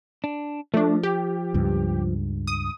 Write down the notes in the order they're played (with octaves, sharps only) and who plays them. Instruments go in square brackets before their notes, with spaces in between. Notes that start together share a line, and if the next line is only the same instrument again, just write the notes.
[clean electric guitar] D4
[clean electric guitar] F3 [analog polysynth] A3 D4
[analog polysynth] G4
[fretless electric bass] C#2 G2
[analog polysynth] D#6